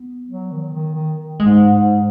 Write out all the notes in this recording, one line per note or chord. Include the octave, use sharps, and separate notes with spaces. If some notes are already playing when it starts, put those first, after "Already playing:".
Already playing: B3
F#3
D#3
D#3
D#3
G#2 G#3
G#2